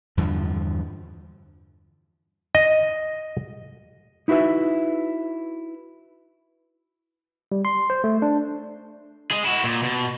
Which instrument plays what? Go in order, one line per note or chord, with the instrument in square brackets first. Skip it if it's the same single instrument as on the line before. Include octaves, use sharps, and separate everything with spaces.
[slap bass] E2 G2 D3 F3
[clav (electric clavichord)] D#5
[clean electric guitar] D#4 E4 F#4 B4 E5
[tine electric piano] G3
C6
C5
A3
D4
[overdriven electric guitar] G#4 D#5
E4 F#4
A#2
B2